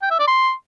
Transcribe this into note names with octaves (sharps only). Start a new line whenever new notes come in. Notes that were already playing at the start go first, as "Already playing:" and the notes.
G5
E5
D5
C6